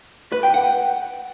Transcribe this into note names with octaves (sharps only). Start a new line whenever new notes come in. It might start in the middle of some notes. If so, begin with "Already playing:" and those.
B4
G5
F#5